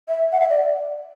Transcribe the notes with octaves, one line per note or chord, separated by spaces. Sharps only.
E5
F#5
E5
D5